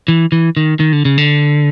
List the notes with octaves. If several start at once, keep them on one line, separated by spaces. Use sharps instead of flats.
E3
E3
D#3
D#3
D3
C#3
D3